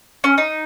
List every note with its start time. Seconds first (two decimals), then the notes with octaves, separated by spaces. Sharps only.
0.24 C#4
0.38 D#4